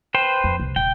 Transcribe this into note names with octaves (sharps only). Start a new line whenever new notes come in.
B4 C5 G5
F2
C2
D#1 G5